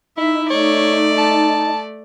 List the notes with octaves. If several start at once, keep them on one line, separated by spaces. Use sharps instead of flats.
D#4 E4 E5
A3 C#5 D5
A5